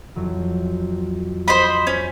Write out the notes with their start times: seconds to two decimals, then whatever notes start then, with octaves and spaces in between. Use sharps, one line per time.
0.16 F2 E3 F#3
1.48 C5 D#5 B5
1.87 C#4